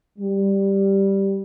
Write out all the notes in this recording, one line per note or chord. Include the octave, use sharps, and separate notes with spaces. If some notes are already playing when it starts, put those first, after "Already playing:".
G3